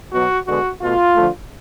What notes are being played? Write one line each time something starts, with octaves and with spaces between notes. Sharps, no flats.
B2 F#3 B3 F#4
D3 G#3 B3 F#4
B2 A3 F4
D3 F3 A3